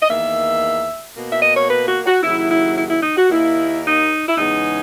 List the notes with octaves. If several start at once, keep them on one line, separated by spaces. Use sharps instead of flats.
D#5
E2 D#3 A#3 E5
B2 A#3
E5
D#5
C#5
B4
F#4
F#4
D#2 C#3 F#3 E4
E4
E4
E4
D#4
F#4
D#2 D#3 A#3 E4
D#4
E4
E2 C#3 G#3 B3 D#4